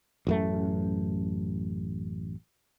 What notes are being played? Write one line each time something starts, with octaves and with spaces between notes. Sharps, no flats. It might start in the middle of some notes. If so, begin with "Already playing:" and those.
A1 F#2 A3